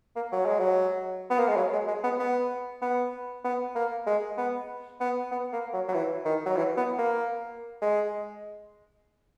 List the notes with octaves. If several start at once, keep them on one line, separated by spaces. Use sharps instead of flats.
A#3
F#3
G#3
F#3
B3
A#3
G#3
F#3
G#3
G#3
B3
B3
B3
B3
A#3
G#3
B3
B3
B3
A#3
F#3
F#3
E3
D#3
F#3
E3
B3
A#3
G#3